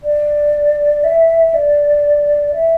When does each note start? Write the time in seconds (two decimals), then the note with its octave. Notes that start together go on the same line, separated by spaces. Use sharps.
0.04 D5
1.04 E5
1.54 D5
2.54 E5